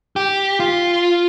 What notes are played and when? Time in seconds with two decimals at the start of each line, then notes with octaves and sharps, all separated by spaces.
0.16 G4
0.60 F4